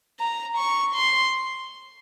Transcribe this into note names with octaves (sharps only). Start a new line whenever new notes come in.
A#5
C#6
C6